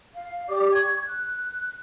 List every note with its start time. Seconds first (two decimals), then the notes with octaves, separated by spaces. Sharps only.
0.14 F5
0.48 G4 D5 D6
0.72 C#6 G#6
1.07 F#6